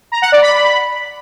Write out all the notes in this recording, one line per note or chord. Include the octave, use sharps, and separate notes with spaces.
A#5
F#5
D5
B5